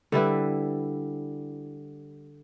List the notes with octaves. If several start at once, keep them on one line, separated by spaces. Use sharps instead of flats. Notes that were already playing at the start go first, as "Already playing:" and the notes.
D3 G3 E4 B4